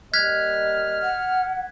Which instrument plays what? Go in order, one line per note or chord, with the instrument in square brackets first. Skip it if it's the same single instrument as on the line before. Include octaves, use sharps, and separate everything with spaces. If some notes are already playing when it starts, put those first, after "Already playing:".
[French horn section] G3 A#3 D#5 [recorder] F6 [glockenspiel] F#6 G#6 B6
[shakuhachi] F#5